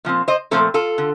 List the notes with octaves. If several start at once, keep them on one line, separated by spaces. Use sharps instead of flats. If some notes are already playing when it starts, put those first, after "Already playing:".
A#2 F3 C4
C5 D#5
A#2 F3 A3 C4 A4 C5
F4 A4
D3